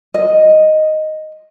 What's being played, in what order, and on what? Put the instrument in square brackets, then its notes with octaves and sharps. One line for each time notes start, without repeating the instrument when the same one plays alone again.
[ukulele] D#5